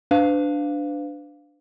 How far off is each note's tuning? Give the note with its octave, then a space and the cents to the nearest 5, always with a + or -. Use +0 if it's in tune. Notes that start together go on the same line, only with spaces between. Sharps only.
D4 +0 B4 +45 F5 +0